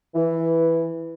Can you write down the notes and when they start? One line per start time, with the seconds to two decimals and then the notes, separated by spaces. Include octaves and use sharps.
0.15 E3